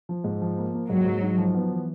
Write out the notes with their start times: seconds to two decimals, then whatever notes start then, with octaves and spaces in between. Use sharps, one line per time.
0.09 F3
0.24 G#2
0.42 F3
0.58 A#3
0.74 A#3
0.90 G#2 F#3
1.06 G#2
1.22 D#4
1.38 F3
1.55 B3
1.71 E3